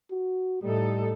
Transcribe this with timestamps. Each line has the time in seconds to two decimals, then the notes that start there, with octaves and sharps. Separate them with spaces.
0.11 F#4
0.62 A2 G3 D#4 A4